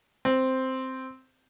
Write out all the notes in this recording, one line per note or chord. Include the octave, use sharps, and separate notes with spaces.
C4